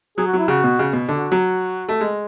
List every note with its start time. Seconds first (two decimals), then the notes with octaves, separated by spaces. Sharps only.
0.18 F#3 G#4
0.27 F#4
0.33 F#3 E4
0.48 C#3 F#4
0.64 B2
0.79 C#3
0.93 B2
1.08 D3 F#4
1.32 F#3
1.89 A3
2.01 G#3